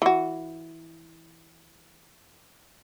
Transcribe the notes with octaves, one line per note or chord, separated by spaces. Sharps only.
E3 F#4